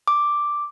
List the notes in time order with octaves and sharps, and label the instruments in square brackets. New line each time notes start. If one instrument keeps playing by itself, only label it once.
[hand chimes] D6